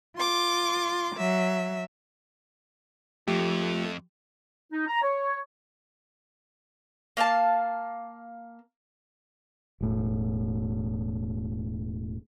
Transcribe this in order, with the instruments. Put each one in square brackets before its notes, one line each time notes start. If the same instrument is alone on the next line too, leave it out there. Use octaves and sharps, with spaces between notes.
[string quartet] F4 C6 D6
F#3 E5
[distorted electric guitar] F2 [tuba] F3 [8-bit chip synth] A3 [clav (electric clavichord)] G4
[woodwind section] D#4
A#5
C#5
[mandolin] A#3 F5 G5 A5
[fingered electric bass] E1 A2